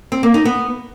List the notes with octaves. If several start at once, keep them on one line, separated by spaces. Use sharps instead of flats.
C4
A#3
D#4
B3